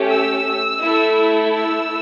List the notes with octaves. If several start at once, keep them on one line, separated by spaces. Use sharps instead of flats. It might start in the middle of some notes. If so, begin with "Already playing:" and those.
Already playing: A3 C#4 G4
E6
A3 E4 A4
E6